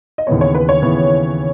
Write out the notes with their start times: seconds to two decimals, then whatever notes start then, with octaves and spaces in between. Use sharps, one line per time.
0.18 D#5
0.27 D#2 C#3 E3 B3 C#5
0.41 C#5
0.55 B4
0.69 C#5
0.82 D#2 C#3 E3 B3